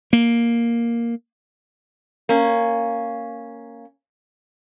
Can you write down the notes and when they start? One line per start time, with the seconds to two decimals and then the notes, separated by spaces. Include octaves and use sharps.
0.13 A#3
2.29 A#3 C#4